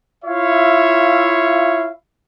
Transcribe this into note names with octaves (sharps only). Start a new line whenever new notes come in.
E4 F4 C#5 E5 F5